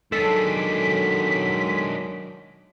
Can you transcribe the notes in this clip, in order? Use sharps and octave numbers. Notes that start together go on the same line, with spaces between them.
D#3 F#3 G#3 D4 A4 B6